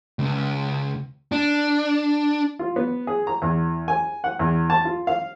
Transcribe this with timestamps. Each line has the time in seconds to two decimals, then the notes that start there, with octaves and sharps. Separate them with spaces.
0.19 C#2
1.32 D4
2.59 F4
2.76 B3
3.07 G#4
3.27 A#5
3.42 E2
3.88 G#5
4.24 F#5
4.39 E2
4.70 A5
4.85 F4
5.07 F5